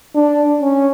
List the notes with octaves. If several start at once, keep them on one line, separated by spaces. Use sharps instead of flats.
D4
C#4